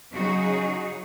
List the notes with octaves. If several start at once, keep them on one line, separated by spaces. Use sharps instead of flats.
C#3 F#3 D#4 F#4 G#4